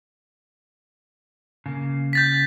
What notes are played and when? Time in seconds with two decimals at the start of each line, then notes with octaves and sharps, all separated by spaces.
1.66 C#3 A#3
2.13 G6 A6 B6